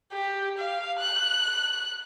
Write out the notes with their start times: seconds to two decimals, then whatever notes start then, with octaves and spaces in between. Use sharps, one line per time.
0.13 G4
0.58 F5
0.99 F#6